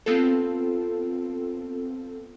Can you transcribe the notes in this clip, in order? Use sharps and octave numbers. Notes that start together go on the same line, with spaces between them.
B3 C4 F4 A4